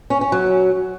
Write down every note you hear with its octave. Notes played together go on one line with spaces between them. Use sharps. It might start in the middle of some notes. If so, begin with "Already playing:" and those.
C#4
C#4
F#3